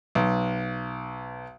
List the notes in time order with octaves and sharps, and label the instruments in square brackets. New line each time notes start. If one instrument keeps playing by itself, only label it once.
[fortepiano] B1